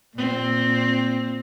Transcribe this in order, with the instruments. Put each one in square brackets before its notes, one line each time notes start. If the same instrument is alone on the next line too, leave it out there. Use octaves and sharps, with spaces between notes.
[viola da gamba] A#2 C4